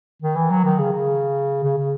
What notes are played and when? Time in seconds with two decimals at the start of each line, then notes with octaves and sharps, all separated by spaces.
0.22 D#3
0.36 E3
0.51 F#3
0.65 D#3
0.79 C#3
0.92 C#3
1.63 C#3
1.78 C#3